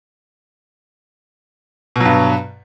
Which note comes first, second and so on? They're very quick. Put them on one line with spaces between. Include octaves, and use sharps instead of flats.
B2 F#3 G2